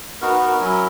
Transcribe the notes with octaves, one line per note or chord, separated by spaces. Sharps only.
B3 D#4 F#4 A#4
B4
A#4
F#3 C#4 E4